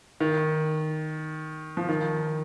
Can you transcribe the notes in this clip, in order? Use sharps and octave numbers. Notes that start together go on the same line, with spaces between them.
D#3
F3
D#3